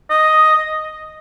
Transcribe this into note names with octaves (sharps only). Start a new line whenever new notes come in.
D#5